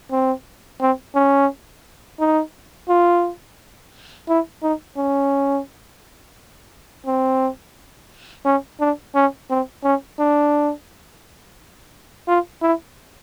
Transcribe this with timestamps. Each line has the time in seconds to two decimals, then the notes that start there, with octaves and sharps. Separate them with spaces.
0.11 C4
0.81 C4
1.15 C#4
2.20 D#4
2.89 F4
4.29 E4
4.63 D#4
4.97 C#4
7.06 C4
8.46 C#4
8.81 D4
9.15 C#4
9.50 C4
9.84 C#4
10.20 D4
12.28 F4
12.62 E4